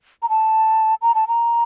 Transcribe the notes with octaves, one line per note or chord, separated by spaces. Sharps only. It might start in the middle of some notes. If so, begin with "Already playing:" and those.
A#5
A5
A#5
A5
A#5